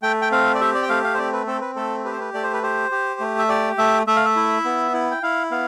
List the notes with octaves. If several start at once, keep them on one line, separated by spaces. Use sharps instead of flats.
A3 G5
G5
C4 F5
D5
G4 E5
D5
G5
A3 F5
F5
C5
C4 D5
B4
C4 A4
B4
A3 A4
G4 B4
C5
B4
A3 D5
C5
B4
G4 C5
G4
A3
E5
G4 D5
A3 E5
A3 E5
F5
E5
E4
B3
E4
G5
E4 F5
B3 F5